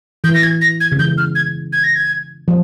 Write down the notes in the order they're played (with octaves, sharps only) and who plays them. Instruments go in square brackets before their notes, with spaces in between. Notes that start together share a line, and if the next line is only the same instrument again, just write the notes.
[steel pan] E3 [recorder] G6
[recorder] A#6
G#6
A#6
G#6
[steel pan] C#3
[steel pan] E3 [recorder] G6
[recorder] F6
G#6
G#6
A#6
G#6
[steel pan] F3